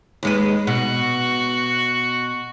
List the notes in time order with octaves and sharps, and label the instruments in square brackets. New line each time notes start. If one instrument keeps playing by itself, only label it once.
[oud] D#2 G#3 B4
[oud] B2 [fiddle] F#4